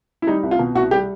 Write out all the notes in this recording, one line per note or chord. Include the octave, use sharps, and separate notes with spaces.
E4
G3 D#4
C2
F4
B2
C2 F#4
G3 G4